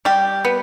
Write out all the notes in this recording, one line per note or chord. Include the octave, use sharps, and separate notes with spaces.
G3 G4
B3